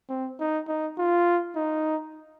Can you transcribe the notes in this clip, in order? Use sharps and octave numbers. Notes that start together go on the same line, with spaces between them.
C4
D#4
D#4
F4
D#4